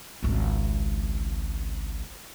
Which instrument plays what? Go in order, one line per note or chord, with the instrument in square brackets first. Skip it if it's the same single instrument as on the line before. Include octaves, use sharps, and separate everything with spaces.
[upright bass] G#1 C#2